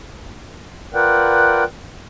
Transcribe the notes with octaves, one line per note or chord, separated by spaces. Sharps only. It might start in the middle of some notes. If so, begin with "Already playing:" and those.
F4 A#4 B4 D5 F#5 G5